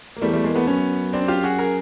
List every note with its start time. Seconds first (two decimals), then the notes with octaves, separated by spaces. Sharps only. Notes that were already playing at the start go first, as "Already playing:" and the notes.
0.16 A#3
0.22 E2 G3 A3
0.33 G3 A3
0.44 G#3 A#3
0.56 A3 B3
0.67 F#2 B3 C#4
1.13 C4 D4
1.28 F4 G4
1.43 F#4 G#4
1.59 G#4 A#4